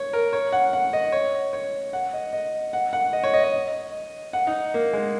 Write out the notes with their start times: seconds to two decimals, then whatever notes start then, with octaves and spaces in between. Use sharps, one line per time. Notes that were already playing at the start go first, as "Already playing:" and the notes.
Already playing: C#5
0.13 A#4
0.33 C#5
0.53 F#5
0.73 F#5
0.93 D#5
1.12 C#5
1.53 C#5
1.93 F#5
2.13 D#5
2.33 D#5
2.73 F#5
2.93 F#5
3.13 D#5
3.24 C#5
3.33 D#5
3.44 D#5
4.33 F#5
4.47 D#4
4.74 A#3
4.93 G#3